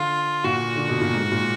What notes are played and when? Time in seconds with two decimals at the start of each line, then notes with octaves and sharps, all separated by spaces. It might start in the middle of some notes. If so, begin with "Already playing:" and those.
Already playing: D3 F4
0.44 A#2 F#4
0.76 D3
0.89 B2
1.01 A#2
1.14 G#2
1.32 A#2